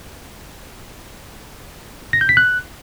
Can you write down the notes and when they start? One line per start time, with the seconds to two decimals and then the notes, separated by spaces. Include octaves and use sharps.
2.13 A#6
2.21 G6
2.29 B6
2.37 F#6